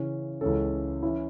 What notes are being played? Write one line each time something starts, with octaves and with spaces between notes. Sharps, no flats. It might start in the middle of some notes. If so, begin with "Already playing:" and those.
Already playing: C#3 E3 C#4
C#2 C#3 E3 C#4 A4
E3 C#4 E4